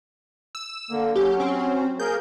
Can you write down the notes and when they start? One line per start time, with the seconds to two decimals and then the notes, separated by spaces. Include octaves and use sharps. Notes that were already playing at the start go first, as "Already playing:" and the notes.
0.55 E6
0.91 D3 A#3
1.16 F#3 C#4 G4
1.40 C4
2.00 A#3 G#4 A#4 G6